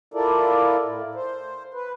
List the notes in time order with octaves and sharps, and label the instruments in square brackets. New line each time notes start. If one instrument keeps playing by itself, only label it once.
[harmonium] E4 F4 A4 A#4 D5
A2
C5
B4